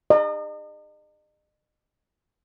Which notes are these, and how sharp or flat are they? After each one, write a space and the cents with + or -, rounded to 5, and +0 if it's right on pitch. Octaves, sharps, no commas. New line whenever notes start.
D#5 -40